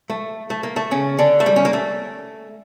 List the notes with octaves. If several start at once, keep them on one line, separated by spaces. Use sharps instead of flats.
A3
A3
A#3
A3
C#3 C#4
D3 D4
A3
G3
C#4
A#3
A3